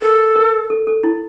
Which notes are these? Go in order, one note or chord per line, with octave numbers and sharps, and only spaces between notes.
A4 A#4
A#4
A4
A4
E4